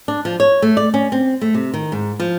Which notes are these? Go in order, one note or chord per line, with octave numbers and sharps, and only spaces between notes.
D4
F3
C#5
A3
D5
C#4
C4
A3
C3
D#3
G#2
F3